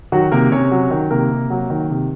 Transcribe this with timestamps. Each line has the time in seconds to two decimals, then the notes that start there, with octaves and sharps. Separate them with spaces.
0.12 D#3 F#3 F#4
0.32 C3 A#3 A#4
0.51 C3 C#4 C#5
0.71 F#3
0.91 D#3
1.11 C3 A#3 A#4
1.31 C3
1.50 F#3
1.70 D#3
1.90 C3